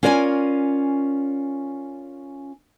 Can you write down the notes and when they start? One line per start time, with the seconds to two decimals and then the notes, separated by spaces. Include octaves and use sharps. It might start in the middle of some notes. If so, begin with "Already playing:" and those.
0.03 C#4 F4 A#4 D5 E5 G#5